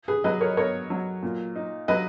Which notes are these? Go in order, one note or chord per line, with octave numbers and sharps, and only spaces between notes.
G#4 B4
F#3 B4 D#5
A#4 C#5
B3 A#4 C#5
F#3
A#2
D#4
F#3 B4 D#5